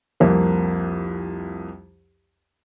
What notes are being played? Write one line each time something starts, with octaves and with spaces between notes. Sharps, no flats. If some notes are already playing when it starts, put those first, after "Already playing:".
C2 F2 A#3